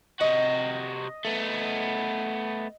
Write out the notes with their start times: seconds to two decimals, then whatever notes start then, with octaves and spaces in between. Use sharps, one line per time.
0.21 C3 F#4 D#5
1.25 A3 B3